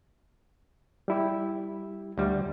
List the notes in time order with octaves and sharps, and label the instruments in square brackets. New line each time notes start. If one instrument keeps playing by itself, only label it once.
[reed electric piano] G3 E4 G4
[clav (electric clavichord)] D2 G3